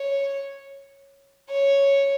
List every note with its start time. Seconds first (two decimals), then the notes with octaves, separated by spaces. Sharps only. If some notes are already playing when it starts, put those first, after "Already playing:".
Already playing: C#5
1.50 C#5